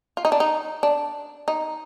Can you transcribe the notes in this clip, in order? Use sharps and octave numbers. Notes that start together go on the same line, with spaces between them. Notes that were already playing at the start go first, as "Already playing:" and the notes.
F4
D#4
D4
D#4
D4
D#4